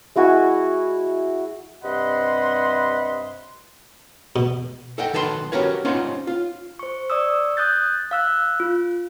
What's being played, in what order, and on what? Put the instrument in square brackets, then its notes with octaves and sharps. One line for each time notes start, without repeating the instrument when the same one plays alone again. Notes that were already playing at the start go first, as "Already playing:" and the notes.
[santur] G#3 E4 F#4 G#5
[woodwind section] G2 C3 D#5 F#5 B5 C6
[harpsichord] B2
[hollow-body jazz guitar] A4 D#5 F#5 G5
B1 D#3 A4 B4 C#5 C6
C#4 F#4 G4 A#4 B4 C#5
C#4 D#4 F4 C5 F5 F#5
F4
[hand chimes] C5 C#6
D5 C#6 D#6 E6
D#6 F#6 G6 A6
F5 E6 F#6
F4